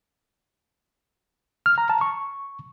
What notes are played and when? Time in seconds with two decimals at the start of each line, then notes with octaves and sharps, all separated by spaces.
1.66 F6
1.78 A#5
1.90 A5
2.01 C#6